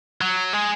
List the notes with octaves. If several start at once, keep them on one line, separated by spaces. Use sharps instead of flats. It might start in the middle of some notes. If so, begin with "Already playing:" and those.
F#3
G#3